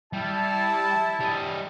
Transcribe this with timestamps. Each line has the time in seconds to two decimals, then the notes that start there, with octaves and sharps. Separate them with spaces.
0.13 G3 E4 A5
1.20 G3 D#5